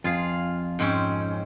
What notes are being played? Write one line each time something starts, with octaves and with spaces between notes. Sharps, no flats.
F2 F4 G#4 F5
G#2 C4 C#4